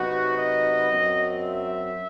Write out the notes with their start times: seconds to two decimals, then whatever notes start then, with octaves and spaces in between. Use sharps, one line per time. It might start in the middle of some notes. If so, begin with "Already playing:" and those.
Already playing: C3 F#3 B3 D#4 F#4
0.38 D#5
0.90 F#2 F#3 C4
1.41 E5